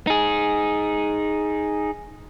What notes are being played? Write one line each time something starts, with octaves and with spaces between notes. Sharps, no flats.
D#4 G#4